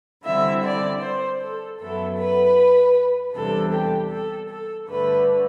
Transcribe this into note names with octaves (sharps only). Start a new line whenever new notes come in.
D3 G3 C4 E4 E5
D5
C5
A4
F#2 F#3 B3 E4 A4
B4
E2 C3 G3 D4 A4
G4
A4
A4
G2 D3 A3 B4